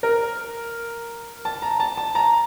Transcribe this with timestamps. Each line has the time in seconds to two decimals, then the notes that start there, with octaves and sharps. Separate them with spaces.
0.03 A#4
1.45 A5
1.62 A#5
1.80 A5
1.97 A5
2.15 A#5